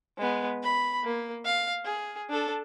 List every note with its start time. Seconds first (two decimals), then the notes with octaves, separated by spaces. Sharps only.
0.18 G#3 B3
0.63 B5
1.04 A#3
1.45 F5
1.85 G#4
2.29 D4 A4